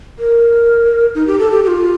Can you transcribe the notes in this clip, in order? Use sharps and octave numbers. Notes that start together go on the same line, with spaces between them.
A#4
D#4
G4
A4
G4
G4
F4